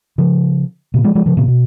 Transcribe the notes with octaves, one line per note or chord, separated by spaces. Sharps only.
C#3 F3
A#2 C#3
F3 G#3
F3 G#3
C#3 F3
A#2 C#3
B2